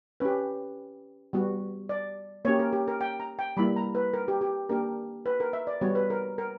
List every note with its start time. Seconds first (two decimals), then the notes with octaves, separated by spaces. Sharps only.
0.20 C#4 G4 B4
1.33 G3 B3 F#4
1.89 D5
2.45 A#3 C#4 G4 C#5
2.59 A#4
2.73 G4
2.88 A#4
3.01 G5
3.20 A#5
3.39 G5
3.57 G3 A#3 E4 B5
3.76 A#5
3.95 B4
4.13 A#4
4.28 G4
4.41 G4
4.69 A#3 D4 G4 A#4
5.26 B4
5.40 A#4
5.53 E5
5.67 D5
5.81 G3 B3 F#4 C#5
5.95 B4
6.10 A#4
6.38 A#4